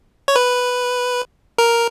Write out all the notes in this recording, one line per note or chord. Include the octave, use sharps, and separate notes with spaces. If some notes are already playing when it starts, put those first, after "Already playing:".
C#5
B4
A#4